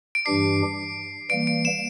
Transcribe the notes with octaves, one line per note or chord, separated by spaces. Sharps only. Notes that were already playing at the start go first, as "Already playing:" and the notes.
D7
G2 E3 G3 D4 G4 C7
E3 G3 A#3 D7
D7
E7